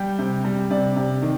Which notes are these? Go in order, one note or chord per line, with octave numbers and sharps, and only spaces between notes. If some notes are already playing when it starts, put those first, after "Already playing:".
Already playing: G3 G5
C3
G3
C3 D5
C3
D#3